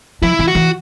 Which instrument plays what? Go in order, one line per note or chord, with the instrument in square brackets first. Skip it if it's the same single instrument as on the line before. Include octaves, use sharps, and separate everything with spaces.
[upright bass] F3 [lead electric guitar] E4
[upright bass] E3
[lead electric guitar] F#4
[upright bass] E3